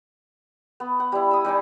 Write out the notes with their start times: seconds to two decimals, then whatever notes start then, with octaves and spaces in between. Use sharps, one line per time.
0.80 B3
1.00 F#5
1.12 G3 E4
1.31 E5 D#6
1.45 G3 D#4 D5 G#5